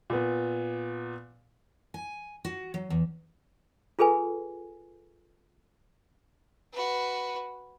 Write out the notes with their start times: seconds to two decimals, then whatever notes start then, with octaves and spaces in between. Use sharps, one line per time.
0.10 A#2 B3
1.94 G#5
2.45 F#4
2.74 F#3
2.90 E2
3.99 F4 G#4 A4 B4 G#5
6.73 F#4 B4